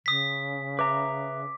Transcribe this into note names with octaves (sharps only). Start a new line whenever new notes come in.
C#3 D#6 B6
B4 E5 A#5 D6